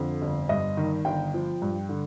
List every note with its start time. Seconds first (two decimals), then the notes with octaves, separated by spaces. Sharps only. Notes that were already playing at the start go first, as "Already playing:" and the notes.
Already playing: F2 D3
0.22 G1
0.49 G2 D#5
0.77 D#3
1.05 G1 G5
1.34 F3
1.62 G2
1.89 D3